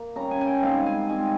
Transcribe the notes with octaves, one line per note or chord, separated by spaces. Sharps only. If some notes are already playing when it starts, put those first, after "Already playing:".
Already playing: A#3
C#3 G3 C#4 A#5
G#5
G#5
G5
G#2 G3 C4 F5
G#5
G#2 G3 C4 G#5